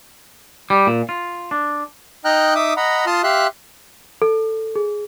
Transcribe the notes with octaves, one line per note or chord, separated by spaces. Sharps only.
G3
A#2
F4
D4
D#4 D#5 G5 A#5 F6 F#6
D#4 E5 D6 D#6
D#5 F#5 A#5 B5
F4 A5 C6 D#6 F6
G4 E5 F5 C6 F#6
A4
G#4